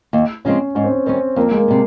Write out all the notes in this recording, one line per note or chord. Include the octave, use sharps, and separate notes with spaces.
D#2
C#3 F3 G#3 C4 C#4
G#2 C#4
C4
C#4
D#3 G3 C4 C#4
F2 A#3
G#3
A#3
C3 G3